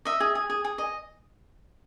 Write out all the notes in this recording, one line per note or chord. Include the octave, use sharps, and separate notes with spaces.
D#5 E5
G#4
G#4
G#4
G#4
D#5